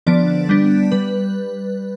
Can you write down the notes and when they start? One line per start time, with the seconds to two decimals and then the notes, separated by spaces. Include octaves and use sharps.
0.07 D3 F3 B3 D4 D5
0.49 G3 B3 D4
0.92 G3 B4